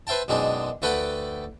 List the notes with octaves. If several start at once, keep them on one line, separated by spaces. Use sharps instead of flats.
B4 C5 E5 G5 A5
F#2 B2 G#3 C4 D4 D#4
D2 A3 A4 B4 F#5 G5